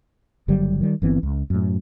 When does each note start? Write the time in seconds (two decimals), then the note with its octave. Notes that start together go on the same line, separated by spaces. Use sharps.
0.48 F#1 D3 F#3 G3
0.81 D#3 G3
1.02 G1 E3 B3 C4
1.23 C#2
1.50 F#2 A2